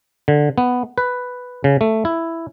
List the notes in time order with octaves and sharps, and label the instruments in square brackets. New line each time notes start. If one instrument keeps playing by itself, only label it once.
[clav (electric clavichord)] D3
B3
B4
C#3
A3
E4